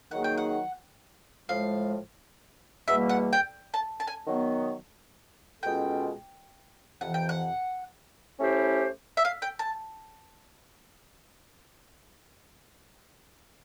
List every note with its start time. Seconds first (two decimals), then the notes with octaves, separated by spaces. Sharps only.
0.11 D#3 F#3 A#3 D#4 G#4 F#5
0.24 G5
0.38 F#5
1.49 A2 F3 G#3 F5
2.88 E2 B2 G3 A#3 E5
3.09 F#5
3.33 G5
3.74 A5
4.00 A5
4.07 G#5
4.25 D#3 F#3 B3
5.62 B2 G#3 C#4 F4 A4 G5
7.01 F2 C3 E3 F#5
7.14 G5
7.29 F#5
8.39 A3 C#4 E4 G4 C5
9.17 E5
9.25 F5
9.42 G5
9.59 A5